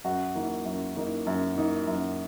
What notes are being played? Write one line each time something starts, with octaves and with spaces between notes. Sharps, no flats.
F#2 F#4
E3 A#3 D#4
F#2
E3 A#3 D#4
F#2
E3 A#3 D#4
F#2